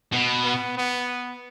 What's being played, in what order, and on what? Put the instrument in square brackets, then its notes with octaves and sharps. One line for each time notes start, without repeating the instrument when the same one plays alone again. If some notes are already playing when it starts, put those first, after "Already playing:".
[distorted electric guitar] B2 [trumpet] B3
[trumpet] B3
B3